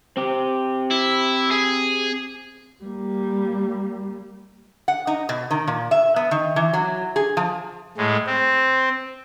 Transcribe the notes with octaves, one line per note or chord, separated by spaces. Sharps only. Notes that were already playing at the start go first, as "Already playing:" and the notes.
C4 G4
E4
G#4
G3 A#3
F#5
D#4
B2
D#3
A#2
E5
B3
D#3
E3
F#3
G#4
F3
A2 G#3
C4